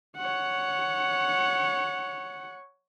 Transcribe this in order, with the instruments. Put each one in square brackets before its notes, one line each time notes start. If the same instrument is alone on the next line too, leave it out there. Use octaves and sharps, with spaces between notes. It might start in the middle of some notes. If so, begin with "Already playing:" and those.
[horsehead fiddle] C#5 F#5